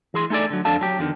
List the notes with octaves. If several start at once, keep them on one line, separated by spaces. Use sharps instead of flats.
E3 G#4 C6
A3 D#4 G#4 A4 D5
D3 F#3
F2 D4 A4 F5 A5
F#3 G4
E2 D3 D#3